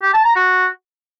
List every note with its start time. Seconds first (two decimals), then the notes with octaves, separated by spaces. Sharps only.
0.02 G4
0.13 A5
0.25 A#5
0.36 F#4